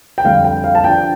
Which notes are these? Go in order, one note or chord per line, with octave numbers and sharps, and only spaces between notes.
G5
F2 D3 G3 F5
G5
F5
A5
G2 F3 D4 G5